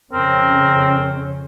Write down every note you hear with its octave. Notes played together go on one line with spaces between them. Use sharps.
F2 C#3 C4 C#4 A#4